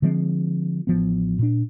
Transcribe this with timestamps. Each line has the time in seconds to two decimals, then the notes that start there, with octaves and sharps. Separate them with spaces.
0.02 D3 F3 G#3 C4
0.87 A1 F3 B3
1.39 A#2 D4